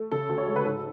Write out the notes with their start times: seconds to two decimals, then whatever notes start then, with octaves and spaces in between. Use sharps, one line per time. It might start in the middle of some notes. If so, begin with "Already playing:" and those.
Already playing: A3
0.11 C#3 A4
0.29 D2
0.38 C#5
0.46 G#3
0.56 B4
0.64 G#2 A4